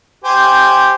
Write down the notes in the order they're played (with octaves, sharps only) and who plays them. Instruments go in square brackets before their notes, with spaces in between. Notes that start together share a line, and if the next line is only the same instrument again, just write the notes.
[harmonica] G4 C5 G#5